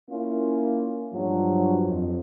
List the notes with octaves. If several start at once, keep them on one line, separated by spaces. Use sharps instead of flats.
A#3 C#4 E4 F4
G2 F3 F#3
F2